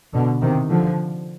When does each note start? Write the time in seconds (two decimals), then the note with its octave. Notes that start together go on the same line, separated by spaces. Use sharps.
0.13 B2 D3
0.41 C3 D#3
0.69 D3 F3